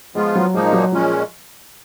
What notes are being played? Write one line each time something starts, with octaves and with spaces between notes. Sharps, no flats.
F3 G#3 B3 F4
F#3
A#2 F3 G#3 A#3 D#4
F#3
A#2 F3 G#3 C#4